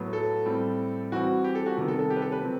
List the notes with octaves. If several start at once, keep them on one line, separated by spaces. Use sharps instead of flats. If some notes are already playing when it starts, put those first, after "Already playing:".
Already playing: A2 F#3 B3
A4
A2 G3 C4
E3 G3 C4 F#4
G4
A4
F#4
C3 D#3 G3 B3
A4
A4
G4
B4
A4
B4
C3 F#3 C4